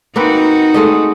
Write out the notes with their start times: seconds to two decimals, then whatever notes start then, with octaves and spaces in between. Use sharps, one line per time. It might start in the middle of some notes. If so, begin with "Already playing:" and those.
0.16 A#3 C4 D#4 F#4 B4
0.74 G#3 A3 D#5